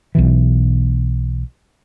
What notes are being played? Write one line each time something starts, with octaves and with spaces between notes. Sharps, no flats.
B1 B2 E3